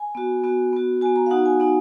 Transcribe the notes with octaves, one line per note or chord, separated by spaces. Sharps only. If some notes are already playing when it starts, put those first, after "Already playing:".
Already playing: G#5
B3 F#4
B3 F#4
B3 F#4
B3 F#4 G#5
A#5
F5
B3 D#4 F#4 F#5
G#5
B3 D#4 F#4 G#5